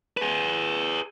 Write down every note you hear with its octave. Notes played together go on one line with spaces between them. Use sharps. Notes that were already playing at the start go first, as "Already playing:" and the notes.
G#4 B4